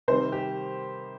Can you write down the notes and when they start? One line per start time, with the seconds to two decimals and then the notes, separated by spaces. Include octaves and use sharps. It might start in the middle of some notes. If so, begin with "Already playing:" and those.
0.08 C3 D#3 G3 C4 C5
0.32 G4